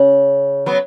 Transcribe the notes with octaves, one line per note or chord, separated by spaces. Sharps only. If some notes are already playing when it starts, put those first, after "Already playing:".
Already playing: C#3
F#3 B3